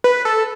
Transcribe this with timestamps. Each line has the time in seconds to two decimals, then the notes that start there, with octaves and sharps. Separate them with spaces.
0.04 B4
0.25 A4